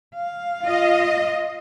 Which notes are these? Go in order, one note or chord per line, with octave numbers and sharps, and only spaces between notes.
F5
F4 D#5